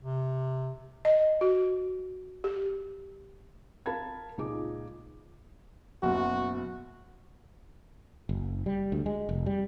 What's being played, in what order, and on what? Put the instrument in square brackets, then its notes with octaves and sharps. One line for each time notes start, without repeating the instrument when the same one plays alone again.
[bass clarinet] C3
[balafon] D#5
F#4
G4
[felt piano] A#4 F5 A5 B5 G#6
C#2 A#2 D#4 G#4 D6
[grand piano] F#1 B2 [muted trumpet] F#4
[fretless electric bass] F#1
G3
D2
G#3
F1
G3